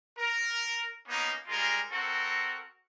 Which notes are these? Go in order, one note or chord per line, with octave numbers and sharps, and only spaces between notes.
A#4
A#3 B3 C#4 D#4
G3 G#3 F4 A#4
C4 F#4 A4 A#4